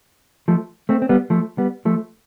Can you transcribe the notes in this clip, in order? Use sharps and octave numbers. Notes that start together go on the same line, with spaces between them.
F3 A3
A3 C4
C4
G3 B3
F3 A3
G3 B3
F3 A3